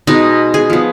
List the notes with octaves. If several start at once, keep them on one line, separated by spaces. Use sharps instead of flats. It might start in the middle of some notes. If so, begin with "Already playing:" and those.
B2 G#3 B3 D#4
G#4
F3 B3